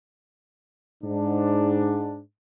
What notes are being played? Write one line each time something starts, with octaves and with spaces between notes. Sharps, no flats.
G#2 D4